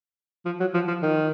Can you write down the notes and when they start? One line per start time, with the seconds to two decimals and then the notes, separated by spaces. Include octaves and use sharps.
0.45 F3
0.60 F#3
0.74 F3
0.88 F3
1.02 D#3